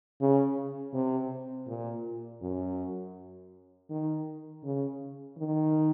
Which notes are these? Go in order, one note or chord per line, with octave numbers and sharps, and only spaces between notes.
C#3
C3
A#2
F#2
D#3
C#3
D#3